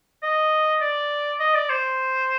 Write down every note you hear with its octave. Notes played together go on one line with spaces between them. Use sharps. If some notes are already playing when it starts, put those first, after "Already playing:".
D#5
D5
D#5
D5
C5